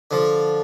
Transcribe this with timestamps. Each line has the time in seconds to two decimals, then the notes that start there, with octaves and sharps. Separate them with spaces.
0.11 D3 F3